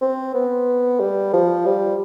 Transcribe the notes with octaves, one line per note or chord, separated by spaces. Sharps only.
C4
B3
G3
F3
G3